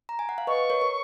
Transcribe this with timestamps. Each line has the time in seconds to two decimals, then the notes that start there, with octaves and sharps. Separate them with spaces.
0.09 A#5
0.19 G#5
0.29 F#5
0.38 F5
0.47 B4 D#5 C#6
0.70 A#4 C#5
0.82 A#4